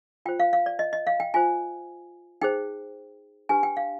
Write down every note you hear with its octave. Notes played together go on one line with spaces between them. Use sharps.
F4 C5 G5
F5
F5
D5
D#5
D#5
F5
G5
F4 C5 G#5
D#4 G#4 C5 G5
D4 G4 B4 G#5
G5
F5